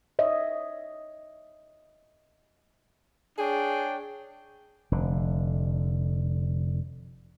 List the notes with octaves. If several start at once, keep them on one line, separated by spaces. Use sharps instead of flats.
C#5 D#5 E5
D4 G#4 C#5 G5
F1 D3